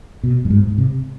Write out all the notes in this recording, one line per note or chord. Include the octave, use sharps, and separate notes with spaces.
B2
G2
G#2
C3